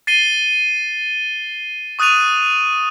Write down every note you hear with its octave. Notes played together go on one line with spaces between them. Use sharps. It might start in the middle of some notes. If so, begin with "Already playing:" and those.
A6 C7 D#7 G7
C#6 D#6 F#6 A6 D#7 F7